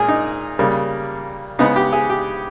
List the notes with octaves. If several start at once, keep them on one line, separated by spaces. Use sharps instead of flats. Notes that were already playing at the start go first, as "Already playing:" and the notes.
Already playing: A#2 G#3 G#4 A#4
D#4
C#3 G3 A#3
C#3 G#3 B3 D#4
G4
G#4
G4